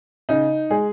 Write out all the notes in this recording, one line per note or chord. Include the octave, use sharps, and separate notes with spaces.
C#3 D#4
G#3 G#4